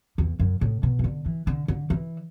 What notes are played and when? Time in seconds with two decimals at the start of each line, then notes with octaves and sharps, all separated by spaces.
0.18 E2
0.39 F#2
0.61 A2
0.83 B2
0.99 E3
1.04 D3
1.26 E3
1.47 D3
1.68 D3
1.90 E3